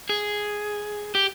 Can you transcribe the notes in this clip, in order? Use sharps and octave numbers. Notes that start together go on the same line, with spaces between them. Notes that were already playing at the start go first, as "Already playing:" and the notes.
G#4
G4